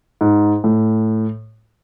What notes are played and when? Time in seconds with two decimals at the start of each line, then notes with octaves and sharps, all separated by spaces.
0.21 G#2
0.64 A2